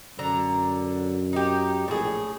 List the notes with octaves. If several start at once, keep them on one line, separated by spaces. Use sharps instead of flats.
F#2 D3 A#5
D#4 G4
A#1 A2 G#4